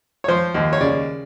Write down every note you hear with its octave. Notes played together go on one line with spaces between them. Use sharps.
C#5
F3 C5
D#2
C#5
C#3 D5